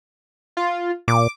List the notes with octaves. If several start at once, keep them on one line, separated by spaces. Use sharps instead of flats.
F4
A#2 D6